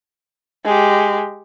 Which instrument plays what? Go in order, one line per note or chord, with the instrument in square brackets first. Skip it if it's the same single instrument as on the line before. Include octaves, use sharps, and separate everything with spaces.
[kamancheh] G#3 G4